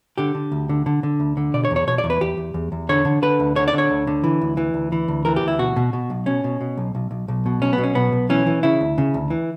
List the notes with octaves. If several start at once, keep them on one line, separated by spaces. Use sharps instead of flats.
D3 G4
D3
D2
D3
D3
D3
D2
D3
B2 D5
C#5
E2
C#5
B2 C#5
D5
E2
B4
E2 G4
E2
E2
E2
D3 C#5
D3
D3 B4
D2
D3 C#5
D5
D3 C#5
D2
D3
E3
D2
E3
D2
E3
D2
E3 A#4
G4
D2
E4
B2 F#4
B2
B2
B1
B2 C#4
B2
B2
B1
B1
B1
B1
B2
B1 C#4
B3
B2
C#4
B1 B3
B1
E3 C#4
E3
C#3 E4
D2
C#3
D2
E3